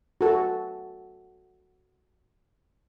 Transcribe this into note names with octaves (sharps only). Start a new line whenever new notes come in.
F#4 A4